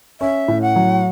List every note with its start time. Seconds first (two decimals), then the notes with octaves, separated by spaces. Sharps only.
0.21 C#4 E5
0.48 A2
0.62 F#5
0.76 F#3